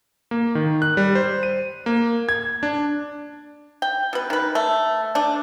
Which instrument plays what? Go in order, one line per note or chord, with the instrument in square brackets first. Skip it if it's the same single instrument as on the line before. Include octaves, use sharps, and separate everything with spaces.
[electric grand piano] A#3
D#3
F#6
G3
C5
D#7
A#3
G#6
D4
[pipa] G5
B2 B4
D#3 B4
A3
A3 D4